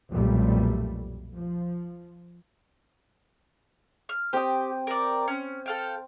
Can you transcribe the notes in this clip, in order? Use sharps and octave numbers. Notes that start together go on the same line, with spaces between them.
B1 F2 A#2 G3 A3
F3
F6
C4 G4 G5 D#6
A#4 D5
C#4
A4 F5 G5